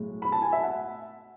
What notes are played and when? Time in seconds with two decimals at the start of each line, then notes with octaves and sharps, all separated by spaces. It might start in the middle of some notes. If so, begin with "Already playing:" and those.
Already playing: B1 A2 G#3
0.22 B5
0.32 A5
0.42 G#5
0.52 E5
0.63 F#5